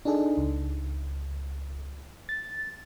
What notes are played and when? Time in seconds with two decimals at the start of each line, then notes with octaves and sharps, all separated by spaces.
0.05 D4 D#4 G#4 A4
0.38 C#2
2.29 A6